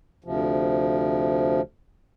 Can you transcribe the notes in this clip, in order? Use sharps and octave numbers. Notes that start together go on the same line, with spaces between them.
D2 C3 F3